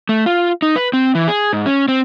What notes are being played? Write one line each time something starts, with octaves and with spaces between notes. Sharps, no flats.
A3
F4
D#4
B4
C4
E3
G#4
G#2
C#4
C4